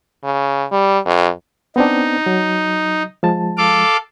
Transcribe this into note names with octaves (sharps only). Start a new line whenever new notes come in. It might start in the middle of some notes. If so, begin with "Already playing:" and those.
C#3
G3
F2
B3 C4 D4 D#4
F#3
F3 G#3 A5
A4 F5 D6